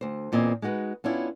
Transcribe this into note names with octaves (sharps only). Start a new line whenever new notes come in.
D2 C5
E2 A#2 C4 D#5 G#5
G#3 D#4 F#4 B4
B3 C#4 D4 E4 F4